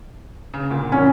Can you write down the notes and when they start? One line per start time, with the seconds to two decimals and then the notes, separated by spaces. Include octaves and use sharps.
0.54 C#3
0.70 D2 A#2 A#3
0.92 A#1 A2 C#4